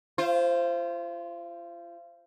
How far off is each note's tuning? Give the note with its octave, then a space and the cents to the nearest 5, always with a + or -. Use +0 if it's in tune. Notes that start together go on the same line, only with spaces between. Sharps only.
F4 -35 C5 +0